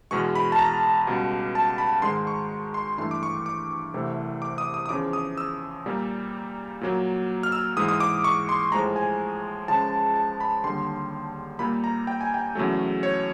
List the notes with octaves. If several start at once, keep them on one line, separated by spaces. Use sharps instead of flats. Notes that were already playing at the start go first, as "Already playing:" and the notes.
E2 B2 G#3 C#6
B5
A5
A#5
C#2 B2 G3
A5
B5
G#2 D#3 G#3 C6
C#6
C6
G2 E3 A3 C6
D6
C#6
D6
C2 C3 E3 A3
D6
D#6
D#6
D#6
E2 C#3 F3 D6
D#6
E6
A#2 G3 A#3
A#2 F#3 A#3
F6
E6
G#2 E3 G#3 D#6
D#6
D6
C#6
C6
A2 F3 G#3 A#5
G#5
C#2 C#3 F3 G#3 A5
A5
B5
D#2 D3 G3 C6
A#2 G3 A#3 B5
A#5
G5
G#5
G5
E2 C#3 F#3 A3
C#5